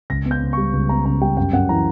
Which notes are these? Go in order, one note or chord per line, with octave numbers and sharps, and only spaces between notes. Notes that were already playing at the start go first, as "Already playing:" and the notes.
C#2 A#6
B3
G6
C#3
G3 C#6
C#2
B3 A#5
C#3 A#5
G3 G5
F#2 G5
F#2 F#5
E3 A#5